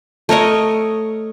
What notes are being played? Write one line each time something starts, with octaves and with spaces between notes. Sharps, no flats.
A3 A#4 C#5 D#5